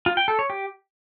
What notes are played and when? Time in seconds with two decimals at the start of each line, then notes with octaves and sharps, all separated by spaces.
0.06 F4
0.17 G5
0.28 A4
0.39 C#5
0.50 G4